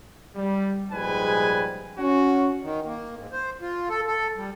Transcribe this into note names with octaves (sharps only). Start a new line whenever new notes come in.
G3
A#1 G#2 G3 G#4 B4 G#5
C#4 F#4
D#3
A#3
G#2
C5
F4
A4
A4
G3